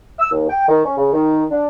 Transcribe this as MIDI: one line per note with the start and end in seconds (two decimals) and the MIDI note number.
0.19 0.27 88
0.32 0.46 39
0.49 0.65 79
0.68 0.82 51
0.85 0.97 61
0.97 1.11 49
1.12 1.43 51
1.51 1.66 62